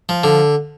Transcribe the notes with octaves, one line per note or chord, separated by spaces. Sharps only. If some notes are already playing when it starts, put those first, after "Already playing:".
F3
D3